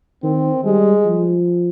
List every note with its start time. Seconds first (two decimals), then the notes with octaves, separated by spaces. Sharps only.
0.23 D#3 C4
0.64 G3 G#3
1.05 F3